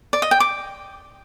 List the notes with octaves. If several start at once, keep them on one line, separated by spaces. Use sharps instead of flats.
D5
D#5
G5
D6